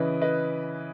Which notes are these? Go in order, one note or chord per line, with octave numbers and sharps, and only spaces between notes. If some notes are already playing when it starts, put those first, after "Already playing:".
Already playing: C#3 E3 B4 D#5
B4 D#5